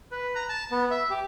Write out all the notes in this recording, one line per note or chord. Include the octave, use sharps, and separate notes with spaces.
B4
A#5
A5
B3
E5
G4